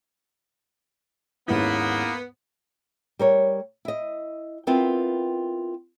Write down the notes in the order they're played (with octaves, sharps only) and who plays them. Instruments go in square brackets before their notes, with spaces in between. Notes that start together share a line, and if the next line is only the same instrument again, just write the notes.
[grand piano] D#2 G#2 C#4 [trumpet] A#3 [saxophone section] B3 [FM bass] E4
[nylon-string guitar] G3 A#4 C#5
E4 D#5
B3 C4 E4 F4 A#4